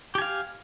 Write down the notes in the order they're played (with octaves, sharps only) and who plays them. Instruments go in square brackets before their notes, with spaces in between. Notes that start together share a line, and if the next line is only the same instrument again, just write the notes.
[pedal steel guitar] G4
G#5
F5